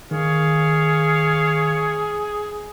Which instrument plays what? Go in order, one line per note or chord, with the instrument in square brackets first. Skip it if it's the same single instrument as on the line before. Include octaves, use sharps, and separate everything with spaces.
[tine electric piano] D#3 [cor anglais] G#4 [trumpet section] C#5 F5